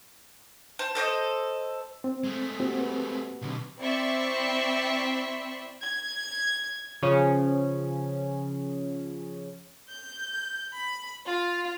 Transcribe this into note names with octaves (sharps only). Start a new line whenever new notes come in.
C5 A5
A4 C5 D5 D#5
C4
G#3 A3
A#3 C4 F#4 G4
B4
B1 B2 D3 C4
C4 E4 D5 E5 C6 C#6
G#6
C#3 F3 C#4
G6
B5
F4